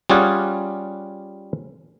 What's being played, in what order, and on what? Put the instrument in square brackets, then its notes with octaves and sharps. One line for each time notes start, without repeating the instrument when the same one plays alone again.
[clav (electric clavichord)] G3 C#4 F4 G#4 D5 F#5